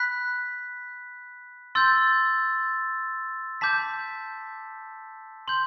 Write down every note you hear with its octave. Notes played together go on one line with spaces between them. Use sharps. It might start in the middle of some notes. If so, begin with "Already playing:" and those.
Already playing: B5 F#6 B6
C6 E6 G6 A6
A5 D6 G6 B6
C6 G6 F#7